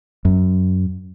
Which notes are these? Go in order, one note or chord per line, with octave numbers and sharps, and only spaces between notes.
F#2